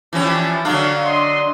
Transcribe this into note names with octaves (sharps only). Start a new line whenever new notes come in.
E3 F3 C#4 D4 G4
D3 F#3 D4 F5
D#5 C6